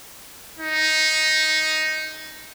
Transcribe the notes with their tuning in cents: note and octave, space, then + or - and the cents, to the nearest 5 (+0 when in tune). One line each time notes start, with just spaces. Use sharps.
D#4 +5